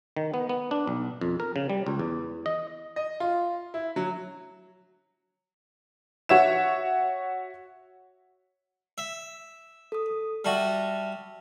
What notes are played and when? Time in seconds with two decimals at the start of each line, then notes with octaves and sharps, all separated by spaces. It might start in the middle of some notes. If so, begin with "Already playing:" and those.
0.17 D#3
0.34 B3
0.49 B3
0.71 D4
0.87 B1
1.21 F2
1.40 A#4
1.56 C#3
1.70 G3
1.86 C#2
1.99 E2
2.46 D#5
2.96 D#5
3.20 F4
3.74 E4
3.96 F#3
6.29 F#4 C#5 E5 E7
8.98 E5
9.92 A4 D#6
10.45 G3 F#4 E5 A5 F6